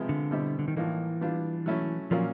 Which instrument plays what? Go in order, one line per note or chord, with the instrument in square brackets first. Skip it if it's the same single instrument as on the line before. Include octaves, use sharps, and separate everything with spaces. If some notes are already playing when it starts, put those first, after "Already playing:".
Already playing: [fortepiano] C3 F3 G#3 B3
[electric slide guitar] D3
[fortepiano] B2 G3 C4 E4
[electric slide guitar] D3
D#3
[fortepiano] A2 F3 A#3 D#4 [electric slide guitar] E3
[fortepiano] G3 B3 D4 F4
F#3 A3 C#4 E4
[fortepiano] A#2 F#3 A#3 C#4 F4 [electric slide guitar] F3